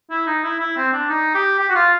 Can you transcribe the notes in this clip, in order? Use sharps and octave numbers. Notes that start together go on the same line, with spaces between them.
E4
D#4
E4
E4
C4
D4
D#4
G4
G4
F#4
F4